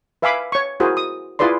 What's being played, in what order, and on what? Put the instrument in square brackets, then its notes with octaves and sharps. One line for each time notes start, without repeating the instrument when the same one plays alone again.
[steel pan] B4 E5 F5 G#5 B5 D6
C#5 C#6
E4 F#4 G#4 A#4 C5
D#6
E4 F4 G#4 B4 D5 C6